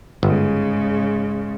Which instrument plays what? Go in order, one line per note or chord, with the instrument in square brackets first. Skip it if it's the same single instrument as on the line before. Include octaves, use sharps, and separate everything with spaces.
[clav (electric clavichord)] G1 [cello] G#2 C#3